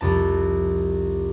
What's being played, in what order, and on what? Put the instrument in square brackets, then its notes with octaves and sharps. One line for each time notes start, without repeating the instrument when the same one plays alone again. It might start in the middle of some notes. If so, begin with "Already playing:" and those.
[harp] C2 F2 A5